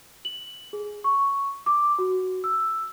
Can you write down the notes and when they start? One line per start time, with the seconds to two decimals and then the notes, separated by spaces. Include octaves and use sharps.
0.25 F#7
0.73 G#4
1.04 C#6
1.66 D6
1.99 F#4
2.44 E6